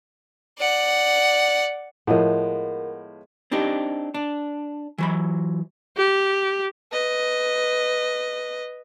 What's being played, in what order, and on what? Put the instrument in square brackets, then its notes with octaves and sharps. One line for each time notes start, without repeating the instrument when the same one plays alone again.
[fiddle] D5 F#5
[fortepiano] A2 F3 [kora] G#3 B3 [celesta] A#4 F#5
[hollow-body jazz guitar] C4 D4 D#4 G4
D4
E3 F#3 B5
[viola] G4
[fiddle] B4 D#5